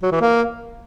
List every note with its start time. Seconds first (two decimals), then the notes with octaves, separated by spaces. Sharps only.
0.02 F#3
0.12 E3
0.21 A#3